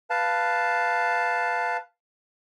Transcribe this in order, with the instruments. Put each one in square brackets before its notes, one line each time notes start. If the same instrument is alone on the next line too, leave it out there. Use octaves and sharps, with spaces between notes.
[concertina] B4 F5 A5